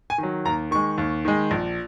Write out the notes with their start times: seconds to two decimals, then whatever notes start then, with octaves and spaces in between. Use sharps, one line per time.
0.10 G#5
0.18 D#3 F#3
0.45 D#2 A#5
0.71 D#3 G#3 C#6
0.98 D#2
1.25 D#3 G#3
1.51 A#1